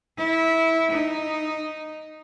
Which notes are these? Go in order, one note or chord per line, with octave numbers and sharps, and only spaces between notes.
E4
D#4